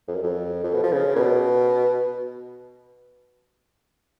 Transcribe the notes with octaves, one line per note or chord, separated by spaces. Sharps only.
F2
F#2
F2
F2
B2
F3
C#3
A#2
B2